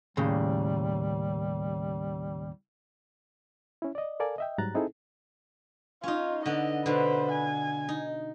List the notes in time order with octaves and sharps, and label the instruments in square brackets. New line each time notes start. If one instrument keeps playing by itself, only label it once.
[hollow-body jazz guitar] D#2 A2 C#3 [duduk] G3
[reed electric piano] C#4 E4
D5 D#5
A4 A#4 D5 F5 G#5
D#5 E5 G5
G#2 F#3 G3 A#5 F#6 A6
C4 D#4 E4 G#4 A4
[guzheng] C#4 D#4 [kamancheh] F4
[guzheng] D3 B3 [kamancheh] D#5
[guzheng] B2 D3 [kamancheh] B4 C5
[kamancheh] G#5
[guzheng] D#4